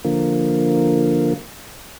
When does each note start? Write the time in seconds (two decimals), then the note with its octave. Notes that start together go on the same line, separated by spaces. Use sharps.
0.05 D3 F3 A#3